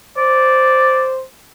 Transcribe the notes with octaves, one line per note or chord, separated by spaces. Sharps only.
C5 D5